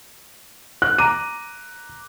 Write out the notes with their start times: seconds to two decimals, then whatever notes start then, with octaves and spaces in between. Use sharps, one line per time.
0.82 F#6
0.98 A#5 D6 D#7